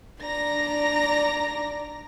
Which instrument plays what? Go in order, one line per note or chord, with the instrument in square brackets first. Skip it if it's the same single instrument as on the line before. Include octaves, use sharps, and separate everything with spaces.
[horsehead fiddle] D4 D5 [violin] A#5 A#6